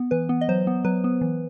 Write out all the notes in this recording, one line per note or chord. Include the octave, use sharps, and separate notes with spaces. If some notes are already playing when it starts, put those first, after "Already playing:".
Already playing: B3
E3 B4
B3
D#5
F#3 C5
B3
F#3 B4
B3
E3